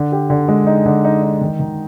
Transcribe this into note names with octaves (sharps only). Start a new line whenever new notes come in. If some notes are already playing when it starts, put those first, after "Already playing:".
Already playing: D3
G4
D3
G#3
D#4
D3
D#4
D#4
D#3
D#3